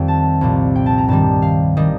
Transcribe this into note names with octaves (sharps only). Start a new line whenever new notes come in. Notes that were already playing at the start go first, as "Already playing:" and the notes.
Already playing: F2 D#3 G3 G5
A5
C2 A#2 F3
G5
A5
A#5
G2 D#3 G3 A5
F5
D#3 G3 D#5